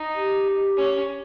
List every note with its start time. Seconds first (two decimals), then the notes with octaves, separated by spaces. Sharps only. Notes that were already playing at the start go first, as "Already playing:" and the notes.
Already playing: D#4
0.15 G4
0.77 C#4